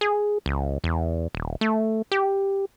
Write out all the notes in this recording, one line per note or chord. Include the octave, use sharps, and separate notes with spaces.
G#4
C#2
E2
D#1
A3
G4